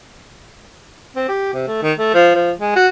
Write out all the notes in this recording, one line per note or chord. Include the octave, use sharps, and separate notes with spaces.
C4
G4
C3
A3
D#3
A3
F3
F3
G#3
F#4